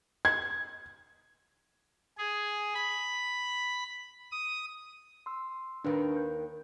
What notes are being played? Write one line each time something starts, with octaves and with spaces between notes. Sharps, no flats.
G#6
G#4
B5
D#6
C6 E6
D#2 D#3 D4 B4
G6